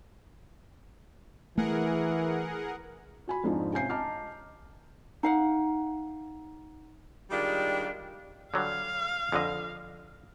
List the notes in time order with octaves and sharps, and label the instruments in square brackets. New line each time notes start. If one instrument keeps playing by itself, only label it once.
[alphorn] E3 [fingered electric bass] A3 [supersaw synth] G#4 A#4 F#5
[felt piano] F#4 G#5 B5
F2 G#2 D4 D#4 F4
C3 C#4 F5 G#5 G6 C7
D#5 A5 A#5 D6 F6
[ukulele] D#4 F5 F#5
[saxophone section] D#3 G3 G#3 D4 F4 G4
[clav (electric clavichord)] D3 F#3 G3 [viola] F5
[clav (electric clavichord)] F2 D3 D#5